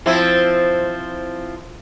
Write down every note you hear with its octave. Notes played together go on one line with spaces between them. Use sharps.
F3 C4 E4